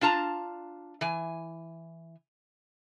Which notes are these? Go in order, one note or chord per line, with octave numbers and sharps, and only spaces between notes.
D4 F4 A5 A#5
E3 G#5